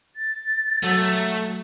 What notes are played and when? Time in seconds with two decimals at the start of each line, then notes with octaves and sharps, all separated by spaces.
0.16 A6
0.83 F#3 A3